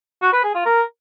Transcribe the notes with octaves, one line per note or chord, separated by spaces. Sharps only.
F#4
B4
G#4
F4
A#4